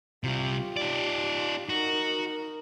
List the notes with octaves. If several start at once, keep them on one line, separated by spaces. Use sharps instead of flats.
C3 G3 F4 G4
D#4 D5
D#4 F#4 A#4